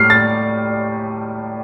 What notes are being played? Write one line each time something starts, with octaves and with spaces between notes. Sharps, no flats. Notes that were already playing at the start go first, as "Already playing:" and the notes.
Already playing: A2 G3 F6 C7
A6